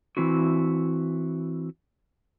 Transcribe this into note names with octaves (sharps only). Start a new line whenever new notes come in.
E3 C4 E4 F#4